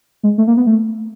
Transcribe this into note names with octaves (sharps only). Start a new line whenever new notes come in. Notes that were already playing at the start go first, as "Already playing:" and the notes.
G#3
A3
A#3
B3
A3